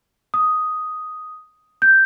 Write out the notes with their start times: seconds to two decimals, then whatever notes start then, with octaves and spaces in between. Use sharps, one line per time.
0.34 D#6
1.82 G6